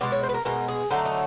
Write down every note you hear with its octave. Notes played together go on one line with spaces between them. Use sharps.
B2 G#3 D5
C#5
C5
B4
A#4
B2 G#3 A#4
G#4
D3 F#3 A3 D#4
D#4